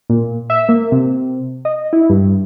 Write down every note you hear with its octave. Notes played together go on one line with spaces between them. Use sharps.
A#2
E5
A#3
C3
D#5
E4
G2